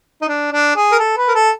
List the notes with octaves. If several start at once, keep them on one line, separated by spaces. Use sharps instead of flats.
D#4
D4
D4
G#4
A#4
A4
B4
A#4
A4